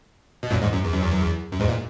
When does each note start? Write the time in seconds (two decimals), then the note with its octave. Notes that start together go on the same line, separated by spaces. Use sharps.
0.43 B2
0.50 F#2 A#2
0.62 E2 G#2
0.73 F#2
0.85 E2
0.94 F#2
1.03 E2
1.12 F#2
1.21 E2
1.52 F#2
1.60 E2 G#2
1.68 A#2